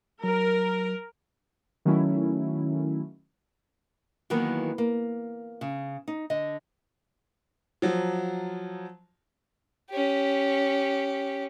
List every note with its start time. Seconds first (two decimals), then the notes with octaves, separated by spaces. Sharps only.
0.24 F#3 A#4
1.85 D#3 F#3 A3 C#4 E4
4.30 D#3 E3 F#3 A#3 B3
4.78 A#3
5.61 C#3
6.08 D#4
6.30 D3 D#5
7.82 F3 F#3
9.90 C#4 G4